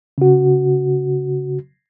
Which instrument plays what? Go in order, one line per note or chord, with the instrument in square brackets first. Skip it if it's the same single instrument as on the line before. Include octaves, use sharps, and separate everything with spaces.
[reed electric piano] C#3 F#4